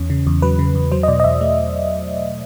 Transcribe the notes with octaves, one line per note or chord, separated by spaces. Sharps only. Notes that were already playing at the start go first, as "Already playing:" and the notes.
Already playing: E2 C#4
C#3
E2
F#3 B4
C#3
E2
F#3 C5
D#5
B2 D5
D#5
E2 E5
A3